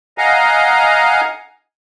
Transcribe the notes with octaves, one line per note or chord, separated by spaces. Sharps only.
D#5 F5 F#5 G#5 A#5